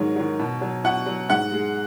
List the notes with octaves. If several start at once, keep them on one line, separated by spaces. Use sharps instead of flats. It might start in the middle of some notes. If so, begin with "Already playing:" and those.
Already playing: G#2 D#3 F#3 C#5
D#3 F#3
B2
F#3
B2 F#5
F#3
G#2 F#5
G#3